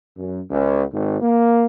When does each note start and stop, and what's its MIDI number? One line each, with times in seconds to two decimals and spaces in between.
0.17 0.40 42
0.50 0.83 37
0.91 1.18 32
1.20 1.66 58